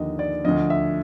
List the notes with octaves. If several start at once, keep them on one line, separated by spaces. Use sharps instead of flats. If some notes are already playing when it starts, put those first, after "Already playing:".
Already playing: D#2 D3 F3 D#5
D5
D2 D3 F3 D#5
E5